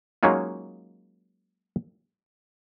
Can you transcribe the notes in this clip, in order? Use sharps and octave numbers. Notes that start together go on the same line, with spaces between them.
F#3 G#3 A#3 C#4 D#4 F4